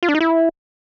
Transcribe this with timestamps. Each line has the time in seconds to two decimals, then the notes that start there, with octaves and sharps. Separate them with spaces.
0.03 F4
0.09 D4
0.15 D#4
0.21 E4